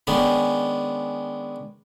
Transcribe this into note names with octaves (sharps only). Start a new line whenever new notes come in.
D#3 G#3 B3 C#4 D4